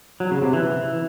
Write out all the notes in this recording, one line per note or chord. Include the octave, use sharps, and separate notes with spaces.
F#3
C#3
C3
E3